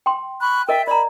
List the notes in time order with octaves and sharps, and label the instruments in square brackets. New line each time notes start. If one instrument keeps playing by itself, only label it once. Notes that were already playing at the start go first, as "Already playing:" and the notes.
[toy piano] G5 C6
[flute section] B5 C#6 F#6
[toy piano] A#4 D#5 [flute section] E5 G5
[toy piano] D5 A#5 [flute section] B5